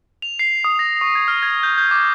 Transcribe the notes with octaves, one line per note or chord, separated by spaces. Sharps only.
F7
C7
D#6
A#6
C#6
G#6
F6
G#6
G6
G6
D6